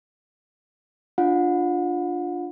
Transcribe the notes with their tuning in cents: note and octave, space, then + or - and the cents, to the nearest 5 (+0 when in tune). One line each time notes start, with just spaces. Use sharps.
D4 +0 F4 +0 F#5 -35